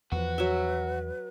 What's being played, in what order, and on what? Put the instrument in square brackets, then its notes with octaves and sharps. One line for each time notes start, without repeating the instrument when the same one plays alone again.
[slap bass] E2 F3 [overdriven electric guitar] F#4 [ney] B4
[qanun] F#3 E5